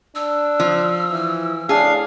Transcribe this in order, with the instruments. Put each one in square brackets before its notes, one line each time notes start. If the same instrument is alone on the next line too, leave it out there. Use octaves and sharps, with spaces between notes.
[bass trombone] D4 [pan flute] E6
[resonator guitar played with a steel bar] F3
[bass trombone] E3
[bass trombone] A2 [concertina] D4 F5 [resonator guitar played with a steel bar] G#4